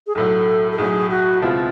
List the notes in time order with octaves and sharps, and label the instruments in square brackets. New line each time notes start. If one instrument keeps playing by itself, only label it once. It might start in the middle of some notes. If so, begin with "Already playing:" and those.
[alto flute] G#4
[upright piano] B1 A2 F#3 [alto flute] A4
[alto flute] A4
[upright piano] B1 A2 F#3 [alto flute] G#4
[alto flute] F#4
[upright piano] C#2 B2 G#3 C4 E4 [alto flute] F4